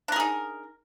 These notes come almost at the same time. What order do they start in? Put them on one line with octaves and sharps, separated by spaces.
D4 A#4 G#4 D#4